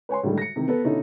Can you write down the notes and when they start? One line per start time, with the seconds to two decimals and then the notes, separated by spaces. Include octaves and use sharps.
0.09 B4 C#5 G#5 C6
0.23 A2 D3 D#3 G3 G#3
0.38 A#6 C#7
0.56 C3 D#3 E3
0.68 B3 A4 B4
0.84 B2 D3 C#4 D#4 E4 A4